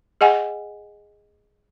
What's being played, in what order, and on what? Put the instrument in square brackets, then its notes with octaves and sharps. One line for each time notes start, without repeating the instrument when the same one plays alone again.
[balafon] G#4 D#5 F#5 G#5